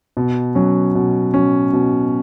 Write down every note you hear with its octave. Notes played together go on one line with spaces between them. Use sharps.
B2
F#3 C#4
B2
F#3 C#4
B2